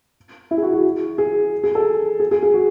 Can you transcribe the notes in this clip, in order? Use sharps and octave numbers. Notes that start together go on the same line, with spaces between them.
E4
G#4
F#4
F#4
G#4
G#4
A4
G#4
G#4
G#4
F#4